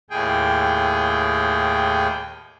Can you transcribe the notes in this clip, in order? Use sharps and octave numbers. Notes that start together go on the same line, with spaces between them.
D#2 A2 G#4 G5